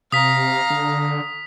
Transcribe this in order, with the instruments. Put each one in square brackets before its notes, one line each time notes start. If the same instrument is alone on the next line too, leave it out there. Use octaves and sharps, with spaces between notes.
[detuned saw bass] C3 [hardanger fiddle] F5 A#5 [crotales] D#6 B6
[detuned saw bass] D3